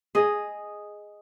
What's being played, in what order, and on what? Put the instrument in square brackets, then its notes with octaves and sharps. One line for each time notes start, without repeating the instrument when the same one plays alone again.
[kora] G#4 D#5